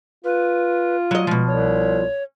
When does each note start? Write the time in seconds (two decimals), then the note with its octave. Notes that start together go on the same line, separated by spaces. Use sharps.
0.25 F4 B4
1.11 F#3 D#5
1.27 B2 F3 G#3
1.47 C2 C#5